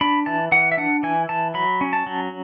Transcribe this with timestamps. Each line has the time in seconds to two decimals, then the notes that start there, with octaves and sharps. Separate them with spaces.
0.01 D4 B5
0.26 E3 A5
0.52 E3 F#5
0.71 E5
0.77 D4 F#5
1.03 E3 G#5
1.29 E3 A5
1.54 F#3 B5
1.81 C#4
1.93 A5
2.06 F#3